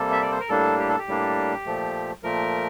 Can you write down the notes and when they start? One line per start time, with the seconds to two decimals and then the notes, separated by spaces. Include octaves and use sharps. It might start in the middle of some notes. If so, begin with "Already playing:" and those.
Already playing: C3 G3 A#3 A4
0.12 E5
0.22 D5
0.32 C5
0.40 A#4
0.49 A2 G3 A#3 D4 A4
0.79 G4
0.89 A4
0.98 G4
1.08 A2 G3 A#3 D4
1.66 A#2 F3 A3
2.23 A#2 F3 A3 A#4